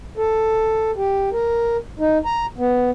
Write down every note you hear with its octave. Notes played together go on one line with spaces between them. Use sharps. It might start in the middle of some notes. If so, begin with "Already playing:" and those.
A4
G4
A#4
D#4
A#5
B3